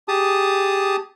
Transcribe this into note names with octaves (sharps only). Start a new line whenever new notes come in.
G4 G#4 A5 D#6